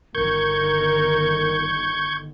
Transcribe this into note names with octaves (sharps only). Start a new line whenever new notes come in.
G1 D3 D#3 A#4 C#6 G6 G#6